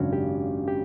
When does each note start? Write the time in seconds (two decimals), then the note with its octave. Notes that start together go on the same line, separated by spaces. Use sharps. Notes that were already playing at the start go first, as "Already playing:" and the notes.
Already playing: G#1 F#2 C#3 C#4 D4 F#4
0.13 G4
0.68 G4